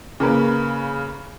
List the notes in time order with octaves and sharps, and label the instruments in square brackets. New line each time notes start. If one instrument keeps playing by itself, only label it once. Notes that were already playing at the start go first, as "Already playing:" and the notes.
[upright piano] C#3 A#3 A#4 B4